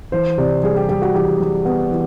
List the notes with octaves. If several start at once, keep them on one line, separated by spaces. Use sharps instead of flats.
E3 C5
C3 D5
G3 G#4
G4
G3 G4
F#4
E3 G4
G3
B3
E3